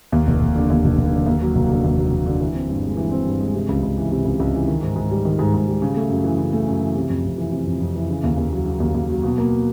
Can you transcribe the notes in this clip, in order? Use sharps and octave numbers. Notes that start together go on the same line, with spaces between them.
D#2
F1
F1
D3
D#2
F1
F1
D3
D#2
F#3
F1
D3
D#2
F#3
F1
D3
E3
C4
G2
G#3
E3
C4
G2
G#3
C3
C#2
C#2
E3
C3
C#2
C#2
E3
D#3
G#2
G#2
G3
D#3
G#2
G#2
G3
C#3
A3
F#2
E3
C#3
A3
F#2
E3
C3
F2
F2
E3
C3
F2
F2
E3
C#3
D#2
D#2
F#3
C#3
D#2
D#2
F#3
B2
A#3